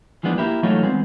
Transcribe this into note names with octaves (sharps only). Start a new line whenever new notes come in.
E3 F3 G#3 B3 D4
A#3 E4 G4
E3 F#3 A3 D#4 F4 C#5
E3 G#3 B3 C4